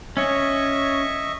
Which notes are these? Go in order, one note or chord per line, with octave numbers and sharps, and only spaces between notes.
C#4 C#5 D#5 E5 C#6